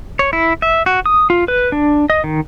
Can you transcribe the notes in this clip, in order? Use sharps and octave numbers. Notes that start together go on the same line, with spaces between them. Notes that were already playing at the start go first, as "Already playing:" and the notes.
C#5
E4
E5
F#4
D#6
F4
B4
D4
D#5
D#3